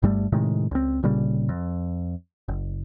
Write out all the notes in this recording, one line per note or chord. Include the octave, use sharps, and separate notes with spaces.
G1 G2 G3 A3
A2 C3 D#3 G#3
C#2 C4
G1 A#2 C#3 G3
F2
F#1